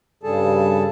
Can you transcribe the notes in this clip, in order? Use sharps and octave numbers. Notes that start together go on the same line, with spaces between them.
G2 C#3 G3 G#4 A4 A5